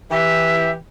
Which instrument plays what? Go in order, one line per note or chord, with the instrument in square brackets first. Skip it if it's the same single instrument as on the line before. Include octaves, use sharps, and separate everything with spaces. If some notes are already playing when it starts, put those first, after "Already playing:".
[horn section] E3 G4 [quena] E5